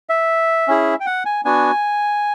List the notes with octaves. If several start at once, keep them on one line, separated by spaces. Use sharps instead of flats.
E5
C#4 E4 G#4
G5
F#5
G#5
B3 D4 F#4 G#5